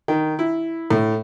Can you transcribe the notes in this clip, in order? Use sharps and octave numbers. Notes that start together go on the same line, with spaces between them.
D#3
E4
A2